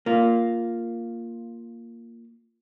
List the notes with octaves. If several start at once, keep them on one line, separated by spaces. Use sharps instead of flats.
A#3 F4